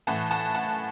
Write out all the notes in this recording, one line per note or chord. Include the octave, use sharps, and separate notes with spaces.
A2 E3 F#5 A5
F#5 A5
F#5 A5